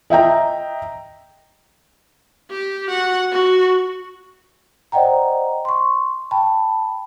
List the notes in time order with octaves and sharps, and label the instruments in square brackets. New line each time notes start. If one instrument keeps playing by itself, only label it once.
[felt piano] D#5 E5 G5 A#5
[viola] G4
F#4 F#5
F#4
[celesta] C5 D5 D#5 F#5 G5 A#5
C6 C#6
G5 A5 B5